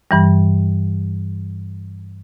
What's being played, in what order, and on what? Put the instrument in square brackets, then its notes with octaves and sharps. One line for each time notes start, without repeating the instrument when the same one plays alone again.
[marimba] G2 E3 G3